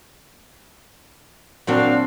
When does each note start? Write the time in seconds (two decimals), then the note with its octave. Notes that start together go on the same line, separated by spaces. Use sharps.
1.67 A#2 F#3 C4 D4 F#4 F5